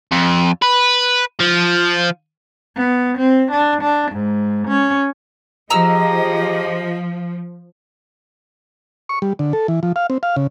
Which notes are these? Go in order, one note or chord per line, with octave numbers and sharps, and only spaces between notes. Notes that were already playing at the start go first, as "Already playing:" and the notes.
F2
B4
F3
B3
C4
D4
D4
G#2
C#4
F3 G4 G#4 D#5 A#5 E6 F6
C#6
G3
D3
A4
E3
F3
F5
C4
F5
C#3